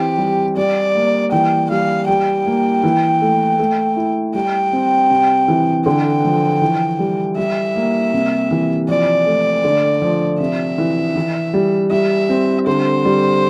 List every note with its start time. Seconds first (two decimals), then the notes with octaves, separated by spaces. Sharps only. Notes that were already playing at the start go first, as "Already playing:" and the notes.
Already playing: E3 C4 G4
0.18 G3
0.57 G3 D5
0.95 A#3
1.32 E3 G5
1.70 G3 F5
2.08 G3 G5
2.46 A#3
2.83 E3
3.21 A3
3.59 A3
3.96 E4
4.34 G3 G5
4.73 C4
5.10 C3
5.48 E3
5.86 D3 G5
6.24 F3
6.62 E3
6.99 G3
7.37 G3 E5
7.76 A#3
8.14 C3
8.51 E3
8.89 F3 D5
9.26 A3
9.64 D3
10.02 F3
10.40 C3 E5
10.78 E3
11.16 E3
11.54 G3
11.91 G3 E5
12.29 C4
12.67 D3 C5
13.05 G3